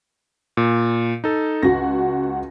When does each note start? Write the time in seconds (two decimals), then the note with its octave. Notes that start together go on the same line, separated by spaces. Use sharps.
0.57 A#2
1.24 D#4 A4
1.63 C#2 F#4 F#5 A#6